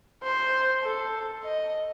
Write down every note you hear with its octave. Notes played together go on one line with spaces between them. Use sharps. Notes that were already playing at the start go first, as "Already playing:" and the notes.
C5
A4
D#5